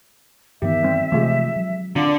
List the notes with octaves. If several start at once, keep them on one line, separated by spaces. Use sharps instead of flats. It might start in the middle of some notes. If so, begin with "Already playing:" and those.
G2 D#3 E3 B3 G4 E5
G3 C4
C3 E3 F3 G#3 A3 G4
F#3
D3 C4 F4